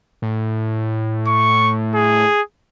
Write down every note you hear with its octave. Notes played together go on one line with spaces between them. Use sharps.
A2
C#6
G#4